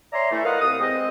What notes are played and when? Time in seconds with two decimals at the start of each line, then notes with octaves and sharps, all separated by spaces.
0.13 C#5 D5 E5 G#5 A#5 C6
0.32 E3 A3
0.44 F4 A#4 B4 D#5 F5 F#5
0.61 C2 D#6
0.80 G#3 C4 D#5